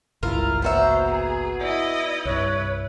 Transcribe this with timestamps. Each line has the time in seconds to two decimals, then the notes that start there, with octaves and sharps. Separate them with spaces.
0.23 G#1 C#2 G2 E4 F4 A#4
0.62 A#3 B3 F#4 C5 E5 A#5
1.10 G#4
1.60 E4 D5 D#5
2.25 C2 G2 E4 B4 C#5